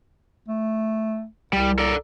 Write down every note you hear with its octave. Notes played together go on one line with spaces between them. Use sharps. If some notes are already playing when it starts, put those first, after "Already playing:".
A3
C2 G3
A4 A#4 D5